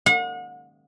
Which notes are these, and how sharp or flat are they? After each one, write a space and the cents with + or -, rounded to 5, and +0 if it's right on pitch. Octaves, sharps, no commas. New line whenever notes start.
F#5 -40